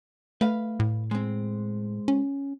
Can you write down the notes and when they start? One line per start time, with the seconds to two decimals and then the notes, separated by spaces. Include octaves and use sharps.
0.41 A3 B4 F5
0.80 A2
1.11 G#3 C4
2.08 C#4